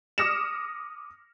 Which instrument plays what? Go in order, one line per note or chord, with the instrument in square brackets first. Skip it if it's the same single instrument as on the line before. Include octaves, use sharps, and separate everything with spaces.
[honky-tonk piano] D6 D#6 F6 A#6 C#7 E7